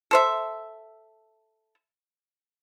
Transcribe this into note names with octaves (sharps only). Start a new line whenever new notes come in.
A4 C5 E5